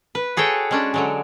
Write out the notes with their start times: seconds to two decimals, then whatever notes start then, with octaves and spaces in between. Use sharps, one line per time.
0.15 B4
0.37 F#4 G#4 A4 C#5 G5
0.71 G#3 C#4 D4
0.94 D3 F#3 G#3